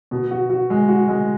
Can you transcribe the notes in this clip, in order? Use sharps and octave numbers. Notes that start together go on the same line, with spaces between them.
B2
F#4
F#4
G#3
F#4
G#3